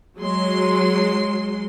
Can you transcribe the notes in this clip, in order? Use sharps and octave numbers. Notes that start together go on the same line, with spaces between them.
F#3 G#3 C6